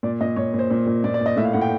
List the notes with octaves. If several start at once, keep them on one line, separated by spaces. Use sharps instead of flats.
A#2 D5
A#2 D#5
A#2 C#5
A#2
C5
A#2
A#2
A#2 D5
D5
A#2
D#5
A2 E5
F5
A2 F#5
G5